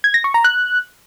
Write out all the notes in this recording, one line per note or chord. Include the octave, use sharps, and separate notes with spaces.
G#6
A#6
C#6
A#5
F#6